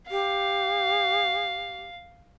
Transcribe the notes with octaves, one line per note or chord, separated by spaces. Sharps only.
G4 F5